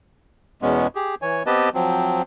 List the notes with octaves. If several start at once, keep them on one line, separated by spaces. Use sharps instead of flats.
E2 B2 G#3 B3 C#4
G4 G#4
E3 C#5 G#5
B3 C4 G4 B4 D#5 A5
F3 F#3 C4